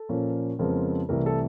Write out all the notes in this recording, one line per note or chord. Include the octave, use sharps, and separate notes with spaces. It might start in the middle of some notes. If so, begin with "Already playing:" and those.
Already playing: A4
A#2 F3 A#3 C#4
F2 C#3 F3 G#3 B3 A#4
C2 C3 E3 A3 A#4
A4